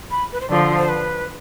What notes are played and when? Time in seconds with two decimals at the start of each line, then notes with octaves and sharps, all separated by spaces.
0.11 B5
0.33 B4
0.41 C5
0.50 D3 F3 D5
0.78 C5
0.89 B4